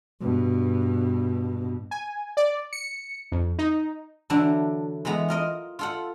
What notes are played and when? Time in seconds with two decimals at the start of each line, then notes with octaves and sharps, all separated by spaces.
0.21 G2 B2
1.91 G#5
2.37 D5
2.73 C#7
3.32 F2
3.58 D#4
4.30 D3 E3 F#3 D4 E4
5.05 E3 G#3 B3 A#5
5.28 F4 A#4 D#5
5.79 F4 A4 F#5